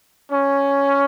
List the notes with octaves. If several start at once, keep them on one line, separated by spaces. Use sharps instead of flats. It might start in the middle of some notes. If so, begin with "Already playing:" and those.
C#4